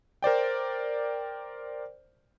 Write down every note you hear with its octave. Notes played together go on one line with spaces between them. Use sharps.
A#4 C5 D5 G5